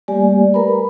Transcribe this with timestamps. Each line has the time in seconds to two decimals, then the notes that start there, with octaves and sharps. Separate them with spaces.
0.08 G3 A3 A#3 G4 D5 G#5
0.54 A#4 B4 A#5 B5